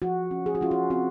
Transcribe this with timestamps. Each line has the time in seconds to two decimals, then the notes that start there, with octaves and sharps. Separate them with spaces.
0.02 F3 F#4
0.31 C#4
0.46 G#4
0.55 F#4
0.61 C#4 F4
0.71 F#4
0.90 C4 F#4